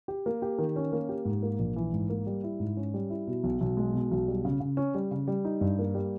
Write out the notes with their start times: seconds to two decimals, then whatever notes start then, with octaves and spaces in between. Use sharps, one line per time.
0.08 G4
0.26 A#3
0.42 G4
0.58 D#3
0.76 C#4
0.92 A#3
1.09 G4
1.25 G#2
1.43 A#3
1.59 A#1
1.76 E3
1.93 G#2
2.10 A#3
2.27 G3
2.44 E4
2.60 G#2
2.77 C#4
2.94 G3
3.10 E4
3.27 B2
3.44 B1
3.61 B1
3.77 G#3
3.94 B2
4.11 B1
4.28 G3
4.45 C#3
4.60 C#3
4.77 C#4
4.95 G3
5.11 C#3
5.28 G3
5.45 D#4
5.61 G2
5.79 A#3
5.95 G3